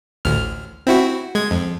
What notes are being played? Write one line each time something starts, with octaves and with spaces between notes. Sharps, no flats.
A1 D2 F6
C4 E4 F#4
G#3 G#6
F2